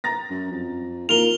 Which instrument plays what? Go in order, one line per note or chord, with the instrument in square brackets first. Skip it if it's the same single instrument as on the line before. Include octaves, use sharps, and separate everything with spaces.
[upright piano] A#5 A6 A#6
[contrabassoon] F#2
F2
[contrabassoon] D#2 [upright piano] F4 A#4 [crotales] F7 G7